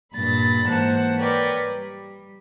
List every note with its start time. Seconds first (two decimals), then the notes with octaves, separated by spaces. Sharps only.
0.15 G2 A#2 B5 A6 A#6
0.67 G#2 E3 A#3 C5 F#5 A5
1.19 A#4 B4 C#5 D5 G5
1.66 G3